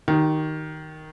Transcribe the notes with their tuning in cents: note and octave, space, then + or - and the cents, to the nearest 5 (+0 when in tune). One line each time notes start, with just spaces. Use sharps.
D#3 +0 G4 -40